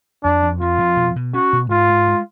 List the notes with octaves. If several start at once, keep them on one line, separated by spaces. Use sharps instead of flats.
F2 D4
F2
F3 F4
F2
B2
B2
C#4 F#4
B2
G#2 F4
G#2
G#3